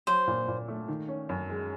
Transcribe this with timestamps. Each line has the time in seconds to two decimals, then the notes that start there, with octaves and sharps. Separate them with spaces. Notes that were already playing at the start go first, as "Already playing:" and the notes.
0.07 F#3 C5
0.27 A#2
0.48 A#2
0.68 A3
0.88 D#3
1.08 C#4
1.29 F#2
1.50 G#3